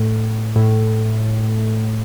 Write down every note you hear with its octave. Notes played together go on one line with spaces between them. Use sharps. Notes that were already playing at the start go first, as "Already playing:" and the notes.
Already playing: A2
A2